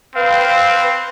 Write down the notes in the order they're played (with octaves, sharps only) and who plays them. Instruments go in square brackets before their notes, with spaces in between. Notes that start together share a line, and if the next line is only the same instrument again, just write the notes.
[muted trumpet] C4 [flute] B4 [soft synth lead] F5